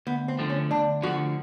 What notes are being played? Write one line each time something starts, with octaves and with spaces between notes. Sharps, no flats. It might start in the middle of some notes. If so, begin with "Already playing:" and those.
D2 B3
C4
D3 F3 A3
C#4
D2 D4
D3 F3 A3 F#4